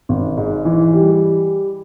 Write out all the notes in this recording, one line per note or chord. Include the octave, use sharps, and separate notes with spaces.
G#1
G#2
E3
G3